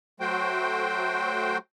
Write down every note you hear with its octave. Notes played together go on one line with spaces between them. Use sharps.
F#3 A3 F#4 C5 G5